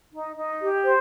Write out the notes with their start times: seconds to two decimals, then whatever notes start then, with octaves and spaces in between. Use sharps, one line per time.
0.12 D#4
0.37 D#4
0.61 G4
0.85 C5